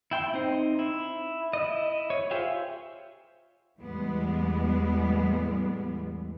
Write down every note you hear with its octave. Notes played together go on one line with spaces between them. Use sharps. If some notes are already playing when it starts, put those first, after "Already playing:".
E4 G5 C6
C4 D#4 C5
E4
E4 D#5
C#5
F4 G4 G#4 C5 E5
E2 A2 E3 G3 G#3 B3